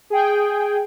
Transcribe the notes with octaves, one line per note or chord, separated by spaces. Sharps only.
G#4 G5